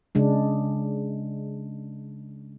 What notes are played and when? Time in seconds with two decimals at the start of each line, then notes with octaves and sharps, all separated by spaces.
0.15 C#3 G#3 D4